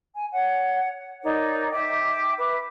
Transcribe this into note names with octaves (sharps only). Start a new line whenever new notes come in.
G#5
C#5 F#5
D#4 A#4 C#5 D5
E5 G5 D6
B4 E5 D6